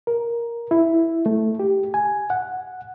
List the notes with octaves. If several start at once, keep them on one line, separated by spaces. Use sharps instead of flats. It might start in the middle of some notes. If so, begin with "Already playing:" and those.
A#4
E4
A3
G4
G#5
F#5